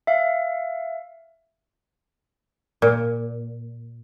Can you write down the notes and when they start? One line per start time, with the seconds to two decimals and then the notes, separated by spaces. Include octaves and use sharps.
0.07 E5 F5
2.82 A#2